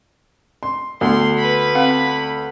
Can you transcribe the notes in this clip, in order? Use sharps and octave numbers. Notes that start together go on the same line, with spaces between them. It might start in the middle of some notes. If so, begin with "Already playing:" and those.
C6
D2 B3 C6
B4 B5
C4 F5 F#5